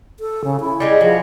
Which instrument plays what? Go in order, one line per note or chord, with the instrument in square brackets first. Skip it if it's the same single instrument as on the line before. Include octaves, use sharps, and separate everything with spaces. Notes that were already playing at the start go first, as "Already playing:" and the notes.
[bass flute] A4
C#3
E4
[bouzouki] G3 G#3 G#4
[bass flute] F3 [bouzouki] F#3